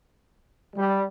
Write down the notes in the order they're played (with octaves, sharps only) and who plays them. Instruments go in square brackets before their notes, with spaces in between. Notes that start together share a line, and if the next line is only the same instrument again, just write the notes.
[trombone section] G3